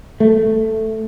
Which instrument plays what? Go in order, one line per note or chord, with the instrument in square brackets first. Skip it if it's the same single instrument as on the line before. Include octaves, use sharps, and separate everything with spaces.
[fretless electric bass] A3